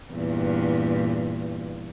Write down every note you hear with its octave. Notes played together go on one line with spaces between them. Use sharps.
E2 G2 A#2